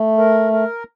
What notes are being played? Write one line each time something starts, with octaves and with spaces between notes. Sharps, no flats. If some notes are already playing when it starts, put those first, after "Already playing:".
Already playing: A3
A#4
A#4